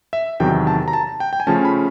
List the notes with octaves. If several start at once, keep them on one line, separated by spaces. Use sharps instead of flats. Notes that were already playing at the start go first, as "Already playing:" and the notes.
E5
E2 C3 D#3 F#3 G5
A5
A#5
A5
G5
G5
G#5
C#3 F3 A3 C#4 A5
B5